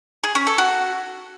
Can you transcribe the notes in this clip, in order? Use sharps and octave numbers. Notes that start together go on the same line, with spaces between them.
G#4
C#4
A4
F#4